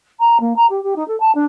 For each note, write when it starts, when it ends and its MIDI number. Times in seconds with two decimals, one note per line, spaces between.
0.19 0.37 82
0.40 0.55 58
0.56 0.65 82
0.69 0.82 67
0.83 0.93 67
0.96 1.06 63
1.07 1.18 69
1.20 1.31 81
1.35 1.45 62